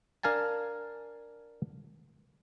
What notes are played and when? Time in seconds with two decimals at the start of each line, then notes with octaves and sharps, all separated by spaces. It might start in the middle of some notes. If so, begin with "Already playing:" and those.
0.23 D4 A#4 F5 G#5 A5